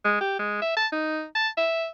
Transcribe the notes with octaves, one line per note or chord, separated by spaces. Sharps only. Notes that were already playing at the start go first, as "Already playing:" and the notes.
G#3
G4
G#3
E5
A5
D#4
A5
E5